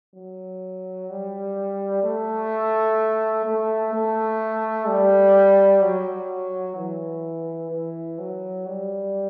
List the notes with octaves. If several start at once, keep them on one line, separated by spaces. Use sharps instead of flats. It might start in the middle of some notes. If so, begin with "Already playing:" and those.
F#3
G3
A3
A3
A3
G3
F#3
E3
E3
F#3
G3